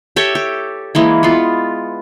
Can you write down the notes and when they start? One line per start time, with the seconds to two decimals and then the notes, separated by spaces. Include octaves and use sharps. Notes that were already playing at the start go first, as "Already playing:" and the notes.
0.16 G4 A4 C#5 E5
0.35 G4
0.95 E3 G#3 A#3
1.23 B3 F4